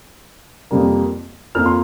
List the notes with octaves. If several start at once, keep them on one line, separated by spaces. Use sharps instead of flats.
F2 C3 G3 A#3
F2 F3 A#3 F6
C6